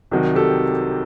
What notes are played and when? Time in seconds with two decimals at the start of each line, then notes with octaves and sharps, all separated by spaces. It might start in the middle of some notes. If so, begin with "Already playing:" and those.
0.11 C2 C3 D#3 F#3
0.35 G4 A4